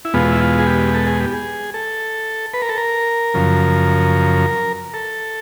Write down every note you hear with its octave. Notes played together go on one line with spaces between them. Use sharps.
E4
E2 B2 G#3 B3 F4
E4
F4
G#4
G4
A4
G#4
G4
G#4
A4
B4
A#4
A4
A#4
F#2 C#3 F3
A4